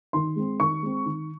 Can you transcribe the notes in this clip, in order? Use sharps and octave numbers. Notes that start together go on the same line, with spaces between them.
D#3 C6
G#3 C4
D#3 C#6
G#3 C4
D#3